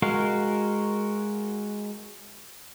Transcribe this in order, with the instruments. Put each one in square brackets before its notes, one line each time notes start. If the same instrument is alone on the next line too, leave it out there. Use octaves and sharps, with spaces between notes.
[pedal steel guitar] G#3 F#4 A#4 F5